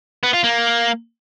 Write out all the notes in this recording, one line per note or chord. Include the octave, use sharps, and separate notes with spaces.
B3
F4
A#3